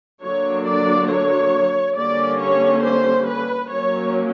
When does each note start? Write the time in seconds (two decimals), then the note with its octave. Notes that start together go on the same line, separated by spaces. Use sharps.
0.23 D3 F#3 A#3 D4 C#5
0.66 D5
1.09 C#5
1.97 D3 G3 A#3 C#4 D5
2.41 C#5
2.84 C5
3.28 B4
3.71 F#3 A#3 C#4 C#5